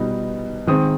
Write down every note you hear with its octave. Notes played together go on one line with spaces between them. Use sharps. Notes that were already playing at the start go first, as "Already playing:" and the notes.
Already playing: B2 G3 B3 D#4
D#3 G#3 C4 D#6